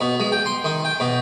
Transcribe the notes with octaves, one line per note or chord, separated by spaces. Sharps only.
B2
G#3
G5
C6
D#3
G5
B2